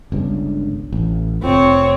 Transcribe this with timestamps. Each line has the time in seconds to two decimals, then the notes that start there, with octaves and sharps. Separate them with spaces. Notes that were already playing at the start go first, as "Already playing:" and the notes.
0.12 G1 C#2 G2
0.93 A1
1.43 F1 F2 F3 C4 C#5